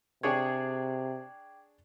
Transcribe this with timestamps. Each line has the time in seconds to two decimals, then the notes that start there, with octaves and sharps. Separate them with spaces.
0.23 C3 D4 G#4 C#5 G5 D6 G#6